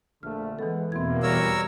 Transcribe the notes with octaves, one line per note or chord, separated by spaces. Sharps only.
A#1 D3 A3 F6
E3 G#3 B3 A4
E2 B2 A#3 C4 E4 G#6
G3 A#4 C#5 E6 F6